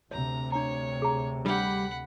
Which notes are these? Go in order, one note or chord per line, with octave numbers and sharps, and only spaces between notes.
D2 C3 C#5 A#5
D4 C#5 A#5
G#4 A#5
G3 D4 G4 F#5 B5